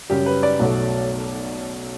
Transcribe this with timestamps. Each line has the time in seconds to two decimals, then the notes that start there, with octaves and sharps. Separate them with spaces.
0.09 F#2 C#3 G3 G4
0.26 B4
0.43 D5
0.59 B1 B2 F#3 A3